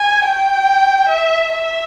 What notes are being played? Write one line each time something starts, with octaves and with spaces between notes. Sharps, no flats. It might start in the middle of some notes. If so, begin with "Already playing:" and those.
Already playing: G#5
G5
E5
E5